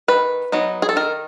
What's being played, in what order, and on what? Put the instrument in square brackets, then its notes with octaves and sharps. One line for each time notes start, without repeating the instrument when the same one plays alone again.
[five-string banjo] D#3 B4
F#3 B3 D#4
G#4
A4
D#3 A#4